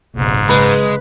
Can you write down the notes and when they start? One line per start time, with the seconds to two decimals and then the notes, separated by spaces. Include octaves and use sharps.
0.16 F#1 B1 G#2
0.49 C#3 G#3 B4